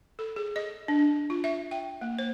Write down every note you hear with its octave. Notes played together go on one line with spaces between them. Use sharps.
A4
G#4
D#5
D4
F4
E5
G5
A#3
C5